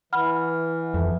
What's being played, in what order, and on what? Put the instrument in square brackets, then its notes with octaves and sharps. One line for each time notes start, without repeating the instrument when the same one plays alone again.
[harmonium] E3 [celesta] F#5 B5 F6
[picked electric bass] F2